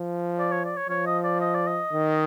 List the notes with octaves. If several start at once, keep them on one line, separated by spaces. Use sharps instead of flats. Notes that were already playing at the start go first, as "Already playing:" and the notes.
Already playing: F3
D5
C#5
D5
C#5
F3 C#5
D#5
D5
D#5
D5
D#5
D#3